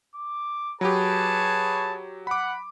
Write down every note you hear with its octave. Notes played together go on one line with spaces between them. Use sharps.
D6
F#3 G4 G#4 B4 C#5 A5
F#5 B5 D6